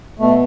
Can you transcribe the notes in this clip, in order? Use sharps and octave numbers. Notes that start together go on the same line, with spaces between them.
B2 A3